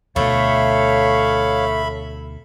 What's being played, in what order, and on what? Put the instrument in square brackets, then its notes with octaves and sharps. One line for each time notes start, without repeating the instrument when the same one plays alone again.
[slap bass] D2 B2 [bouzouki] A3 [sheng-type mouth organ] C#5 F5 [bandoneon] E5 B5